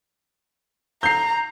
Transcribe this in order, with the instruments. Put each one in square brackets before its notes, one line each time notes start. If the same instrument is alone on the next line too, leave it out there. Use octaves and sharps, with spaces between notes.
[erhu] A#5 [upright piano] G6 C7